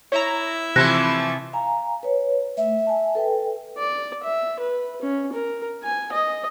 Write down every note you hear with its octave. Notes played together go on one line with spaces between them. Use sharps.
E4 C#5 E5 A#5
C3 E3 F3 A3 F#6 A#6
F5 G#5 A#5
B4 C#5
A3 E5
G#5 A5
A4 B4 G5
D5
E5
B4
C#4
A#4
G#5
D#5